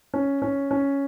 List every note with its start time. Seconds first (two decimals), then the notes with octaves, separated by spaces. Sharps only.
0.14 C#4
0.42 C#4
0.71 C#4